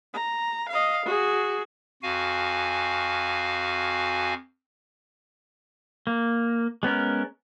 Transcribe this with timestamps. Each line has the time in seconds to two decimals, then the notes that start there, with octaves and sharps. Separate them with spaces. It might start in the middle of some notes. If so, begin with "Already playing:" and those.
0.14 A#5
0.69 D#5 F5
1.06 F#4 G#4
2.03 F2 F#4 F5 G#5
6.07 A#3
6.83 G#3 B3 C#4 A#4